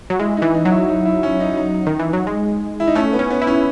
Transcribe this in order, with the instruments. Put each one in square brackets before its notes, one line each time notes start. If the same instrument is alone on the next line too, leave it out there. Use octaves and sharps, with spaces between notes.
[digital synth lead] F#3
[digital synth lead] G#3 [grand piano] E4
[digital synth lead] E3 [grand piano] D#4
[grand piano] D#4
[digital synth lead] F#3
[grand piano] E4
D#4
E4
C#4
D#4
D#4
[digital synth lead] D#3
E3
F#3
G#3
[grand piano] E4
D#4
[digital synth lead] A3 [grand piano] C#4
[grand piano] B3
[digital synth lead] C#4
[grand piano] B3
[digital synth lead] E4
[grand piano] C#4